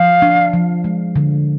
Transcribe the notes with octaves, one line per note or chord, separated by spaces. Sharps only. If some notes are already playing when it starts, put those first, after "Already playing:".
Already playing: F3 F5
D4
F3
G#3
D3